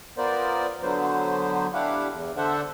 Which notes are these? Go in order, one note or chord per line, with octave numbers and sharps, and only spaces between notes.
B3 F4 A#4 C5 D5
D3 F#3 B3 C5
D4 E4 G4 F5 F#5
E2
D3 D4 A4 C5 E5 F#5